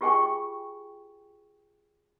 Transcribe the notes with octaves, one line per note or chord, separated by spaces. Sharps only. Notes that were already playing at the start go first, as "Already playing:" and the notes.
F4 G4 G#4 G5 G#5 C#6